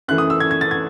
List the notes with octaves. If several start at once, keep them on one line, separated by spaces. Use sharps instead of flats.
F#2 E3 A3 F#6
D#6
E6
G#6
G#6
A6
G#6